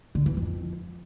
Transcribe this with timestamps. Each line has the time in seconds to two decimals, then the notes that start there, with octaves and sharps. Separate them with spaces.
0.15 D3
0.26 E3
0.37 F2